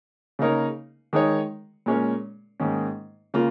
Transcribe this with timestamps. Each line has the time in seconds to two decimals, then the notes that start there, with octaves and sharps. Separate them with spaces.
0.39 C#3 A#3 D#4 A#4 C#5
1.13 D#3 G#3 D#4 C#5
1.86 A#2 G#3 C#4 A#4 C#5
2.60 G#2 D#3 A#3 C#4
3.34 C#3 A#3 F4